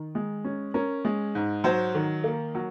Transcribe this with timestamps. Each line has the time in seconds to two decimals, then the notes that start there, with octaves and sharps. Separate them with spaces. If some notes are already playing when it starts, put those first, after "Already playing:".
Already playing: D#3
0.15 G#3
0.44 C#4
0.74 C#4 A#4
1.05 G#3
1.35 G#2
1.64 F#3 C5
1.95 D#3
2.24 A#3
2.55 F#3